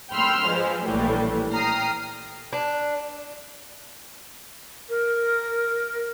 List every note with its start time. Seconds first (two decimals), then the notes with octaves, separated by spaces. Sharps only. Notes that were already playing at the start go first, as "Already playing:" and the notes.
0.14 G5 B5 C6 E6 F6
0.48 F3 G#3 B4 C5
0.85 A#1 A2 E3 G3 A#3
1.52 G5 A#5 D#6 F6 C7
2.53 D4
4.89 A#4